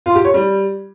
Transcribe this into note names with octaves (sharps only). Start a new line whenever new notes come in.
F4
G4
C#5
G3